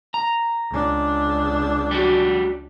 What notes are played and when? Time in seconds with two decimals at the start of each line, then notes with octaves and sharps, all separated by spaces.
0.14 A#5
0.70 C#2 D4
1.91 G3 F#4